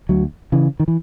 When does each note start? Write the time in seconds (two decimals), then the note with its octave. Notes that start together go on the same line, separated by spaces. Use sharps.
0.09 D2 F#3
0.52 C#3 E3
0.80 D#3
0.88 E3